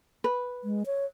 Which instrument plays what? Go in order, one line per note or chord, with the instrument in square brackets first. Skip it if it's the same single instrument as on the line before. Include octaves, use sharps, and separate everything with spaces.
[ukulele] B4
[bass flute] G#3
C#5